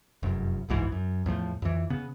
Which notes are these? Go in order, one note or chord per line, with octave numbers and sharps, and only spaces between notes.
F1 F#2
F#1 B1 G#2 E3
F#2
E2 A2 F3 A3
F2 E3
C#3 B3